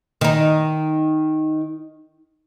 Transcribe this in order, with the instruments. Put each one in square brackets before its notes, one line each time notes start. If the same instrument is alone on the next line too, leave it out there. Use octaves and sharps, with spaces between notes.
[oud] D#3 D#4